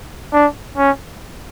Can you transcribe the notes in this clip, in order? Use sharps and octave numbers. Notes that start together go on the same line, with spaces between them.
D4
C#4